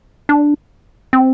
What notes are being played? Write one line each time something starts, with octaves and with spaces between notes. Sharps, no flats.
D4
C4